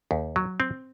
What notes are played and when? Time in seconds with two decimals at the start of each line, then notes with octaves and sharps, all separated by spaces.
0.11 D#2
0.36 F#3
0.60 C4